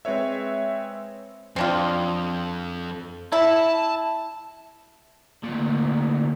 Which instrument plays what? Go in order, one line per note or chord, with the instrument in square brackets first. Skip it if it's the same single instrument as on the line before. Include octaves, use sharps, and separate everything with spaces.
[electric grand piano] G#3 C4 B4 C#5 E5
[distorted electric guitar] F2 [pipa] C4 D4 F4
[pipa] E4 [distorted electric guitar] A5
[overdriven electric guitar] D2 A#2